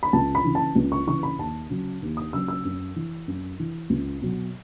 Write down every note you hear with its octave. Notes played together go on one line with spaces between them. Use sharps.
B5
C#2 A5
B5
C#3 E3
A5
C#2
C#6
C#3 E3 C#6
B5
D#2 A5
C#3 F#3
D#2
D#6
C#3 F#3 E6
E6
F#2
E3
F#2
E3
C#2
B2 F#3